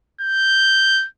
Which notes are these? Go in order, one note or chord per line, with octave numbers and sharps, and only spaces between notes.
G6